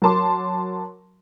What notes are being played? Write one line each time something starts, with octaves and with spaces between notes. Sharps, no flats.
F#3 A#4 A5 C6 D6